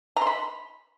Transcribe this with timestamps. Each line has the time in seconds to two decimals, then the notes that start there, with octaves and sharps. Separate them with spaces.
0.16 A#5
0.22 C6
0.27 B5